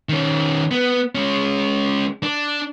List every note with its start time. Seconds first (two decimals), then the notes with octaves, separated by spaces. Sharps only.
0.09 D#3 C#4
0.71 B3
1.15 G#3 C#4
2.23 D4